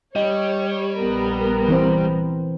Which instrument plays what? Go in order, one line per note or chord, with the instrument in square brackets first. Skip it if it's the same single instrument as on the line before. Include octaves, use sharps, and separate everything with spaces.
[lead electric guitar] G3 [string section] C#5 [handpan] D#5
[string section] A#1 B3 A#4
[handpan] E3 C4 C5